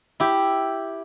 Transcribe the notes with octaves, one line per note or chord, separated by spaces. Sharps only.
E4 G4